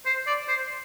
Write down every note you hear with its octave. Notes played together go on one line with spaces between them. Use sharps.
C5
D5
C5